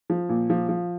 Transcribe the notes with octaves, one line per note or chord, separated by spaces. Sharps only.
F3
A#2
F3
F3